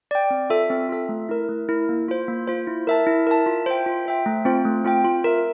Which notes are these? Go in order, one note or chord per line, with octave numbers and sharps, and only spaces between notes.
D5 G5
C4
F4 A4 E5
C4
F4 A4 E5
A3
E4 A#4
A3
E4 A#4
A#3
F4 C5
A#3
F4 C5
E4
A#4 E5 A5
E4
A#4 E5 A5
F4
C5 E5 G5
F4
C5 E5 G5
A3
C4 F4 C5 G5
A3
C4 F4 C5 G5
F4
A#4 E5